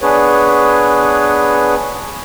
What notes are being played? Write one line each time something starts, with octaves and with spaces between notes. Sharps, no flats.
B3 D4 G#4 B4 C#5